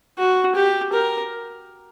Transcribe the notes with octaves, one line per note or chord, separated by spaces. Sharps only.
F#4
G4
A#4